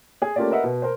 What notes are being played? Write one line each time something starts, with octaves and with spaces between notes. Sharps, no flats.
G#4
A3 A#3 C#4 F4 G4 D5
A#4 B4 D#5 E5 F#5
B2
A#4 C5